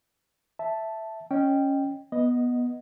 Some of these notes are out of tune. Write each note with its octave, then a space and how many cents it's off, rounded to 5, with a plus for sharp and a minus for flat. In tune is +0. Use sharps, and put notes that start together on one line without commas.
E5 +0 A5 +0
C#4 +0 D#5 -10 G5 +0
B3 -10 D#5 +0